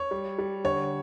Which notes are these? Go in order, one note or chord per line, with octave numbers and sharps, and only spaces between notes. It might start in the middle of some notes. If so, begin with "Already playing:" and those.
Already playing: C#5
G3
G3
D3 C#5